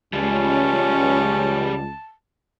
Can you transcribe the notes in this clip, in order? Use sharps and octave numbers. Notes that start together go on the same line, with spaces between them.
C#2 G3 G#3 C#4 A5